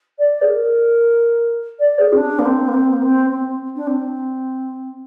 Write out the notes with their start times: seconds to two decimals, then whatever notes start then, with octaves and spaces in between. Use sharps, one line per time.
0.19 D5
0.42 G#4
0.48 A#4
1.80 D5
1.99 G#4
2.13 C4
2.17 D4
2.39 A#3
2.45 C4
2.68 A#3
2.74 C4
2.93 A#3
3.02 C4
3.30 C4
3.76 D4
3.87 C4